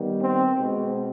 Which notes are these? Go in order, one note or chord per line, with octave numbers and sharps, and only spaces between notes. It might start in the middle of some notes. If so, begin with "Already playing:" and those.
Already playing: D#3 G3 B3
C4
B2 G#3 C4